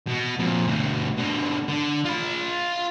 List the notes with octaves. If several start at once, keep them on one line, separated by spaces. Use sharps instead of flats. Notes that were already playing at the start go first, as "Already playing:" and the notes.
B2
F2 A#2
D2 B2
B2 D3
D3
F4 B5